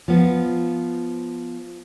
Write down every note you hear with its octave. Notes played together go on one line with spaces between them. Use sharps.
F3 B3